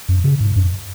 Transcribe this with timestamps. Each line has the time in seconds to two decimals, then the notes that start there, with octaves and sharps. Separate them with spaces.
0.09 F#2
0.24 C#3
0.40 G#2
0.56 F#2